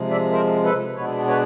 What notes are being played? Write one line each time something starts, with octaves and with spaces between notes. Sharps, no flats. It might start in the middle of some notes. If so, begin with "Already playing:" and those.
Already playing: C3 F3 G#3
D5 E5
A#4 C5
A4 B4
B2 G#3 B3 D4 B4 C#5
B4 C#5